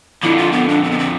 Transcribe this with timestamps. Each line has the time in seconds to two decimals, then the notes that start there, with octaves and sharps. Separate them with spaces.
0.23 F2 D3 F3 E4
0.38 F4
0.53 B3
0.69 D4
0.83 C4
0.91 B3
0.99 C4